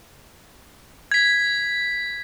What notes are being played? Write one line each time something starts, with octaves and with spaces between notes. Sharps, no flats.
G#6 B6